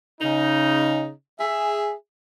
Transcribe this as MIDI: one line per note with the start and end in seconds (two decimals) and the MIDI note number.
0.21 1.12 49
0.21 1.12 63
1.40 1.92 68
1.40 1.92 76